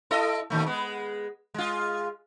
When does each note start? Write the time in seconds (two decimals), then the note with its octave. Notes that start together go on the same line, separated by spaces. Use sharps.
0.11 E4 A4 D#5
0.50 A#2 D#3 A3
0.66 G#3 B3
1.54 G#3 F4